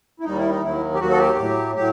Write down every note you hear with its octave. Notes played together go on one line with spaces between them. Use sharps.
E4
D#2 D#3 G3 D#4
E4
D#4
D#2 D#3 F#3 E4
G4
D#2 D#3 F#3 F#4
A4
G4
A2 F#3
A2 F#3 G4